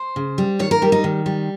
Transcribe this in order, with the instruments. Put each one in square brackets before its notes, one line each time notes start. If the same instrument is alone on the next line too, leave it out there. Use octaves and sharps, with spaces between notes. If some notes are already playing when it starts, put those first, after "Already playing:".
Already playing: [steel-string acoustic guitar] C5
C#3
G3
D#3 C#5
A#4
G3 G4
D#4
D#3
G3